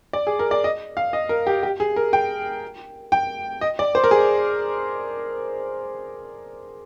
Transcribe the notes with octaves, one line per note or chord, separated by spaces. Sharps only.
D5
G#4
A#4
D5
D#5
F5
D#5
A#4
G4
G4
G#4
A#4
G5
G5
D#5
D5
C5
A#4
G#4